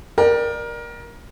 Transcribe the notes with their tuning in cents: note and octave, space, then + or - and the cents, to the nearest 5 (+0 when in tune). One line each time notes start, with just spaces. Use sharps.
A#4 +20 D5 +25 G5 -5